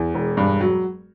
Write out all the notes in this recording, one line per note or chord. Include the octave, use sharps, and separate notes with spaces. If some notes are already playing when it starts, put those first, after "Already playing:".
Already playing: E2
E1
G2
F#3